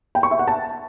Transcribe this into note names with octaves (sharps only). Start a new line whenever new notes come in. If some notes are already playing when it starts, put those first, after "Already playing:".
G5
C#6
E5
F#5
A5